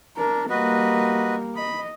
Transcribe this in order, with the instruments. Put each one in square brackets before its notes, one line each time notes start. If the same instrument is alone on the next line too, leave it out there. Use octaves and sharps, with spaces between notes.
[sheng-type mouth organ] D4 [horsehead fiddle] A#4
[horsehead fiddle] G3 A#3 [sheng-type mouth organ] F#4 B4 D#5
[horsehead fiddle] D#5 [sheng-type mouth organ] B5